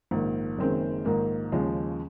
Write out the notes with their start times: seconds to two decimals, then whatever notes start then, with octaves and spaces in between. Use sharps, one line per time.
0.11 A#1 G#2 D#3
0.58 F#1 F#2 D#3 G#3 C4
1.05 A#1 G#2 D#3 A#3
1.52 D#2 C#3 F3 G#3